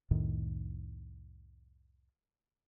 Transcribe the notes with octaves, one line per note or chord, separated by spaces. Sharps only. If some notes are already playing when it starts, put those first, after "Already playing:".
C2 F2 A2 D#3